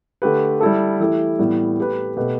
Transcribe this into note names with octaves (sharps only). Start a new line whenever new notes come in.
D3 A3 G4 B4
G3 E4 A4
E3 A3 E4 G4
A2 E3 G3 B3
A3 G4 B4
B2 A3 G4 B4